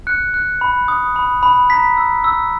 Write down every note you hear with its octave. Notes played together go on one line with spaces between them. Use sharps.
F#6 C#7
F#6
B5
D#6
B5
B5
A#5 B6
E6
E6